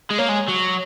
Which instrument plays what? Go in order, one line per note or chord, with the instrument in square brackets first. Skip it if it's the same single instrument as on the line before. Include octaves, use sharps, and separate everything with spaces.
[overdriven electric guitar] G#3
[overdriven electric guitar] A#3 [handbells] C#5
[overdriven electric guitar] G#3
F#3